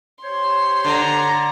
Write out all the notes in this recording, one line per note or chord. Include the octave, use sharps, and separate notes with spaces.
G4 C5 C#5 C6
D3 A#5